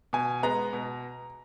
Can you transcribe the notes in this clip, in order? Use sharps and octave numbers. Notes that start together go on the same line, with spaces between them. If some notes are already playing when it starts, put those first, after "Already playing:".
B2 G#5
G#3 B3 A#5
B2